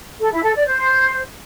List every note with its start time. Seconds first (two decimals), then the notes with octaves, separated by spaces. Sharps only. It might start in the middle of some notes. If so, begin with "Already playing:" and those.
0.20 A4
0.31 E4
0.43 A4
0.55 D5
0.66 C5